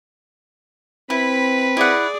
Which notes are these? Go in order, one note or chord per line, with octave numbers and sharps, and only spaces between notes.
C4 E4 B4 B5
E4 G#4 D5 F#5